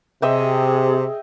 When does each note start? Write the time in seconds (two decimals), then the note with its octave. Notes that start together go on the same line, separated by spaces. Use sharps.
0.22 C3 G#4 D#5 E5 G5